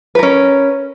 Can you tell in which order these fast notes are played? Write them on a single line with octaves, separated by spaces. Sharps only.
B4 A#4 C#4